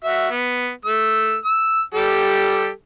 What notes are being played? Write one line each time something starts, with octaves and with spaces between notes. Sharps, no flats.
F#4 E5
B3
A3 E6
E6
G3 G4 A4